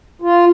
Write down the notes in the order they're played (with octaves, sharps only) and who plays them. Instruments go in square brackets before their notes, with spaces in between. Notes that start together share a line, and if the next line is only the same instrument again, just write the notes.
[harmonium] F4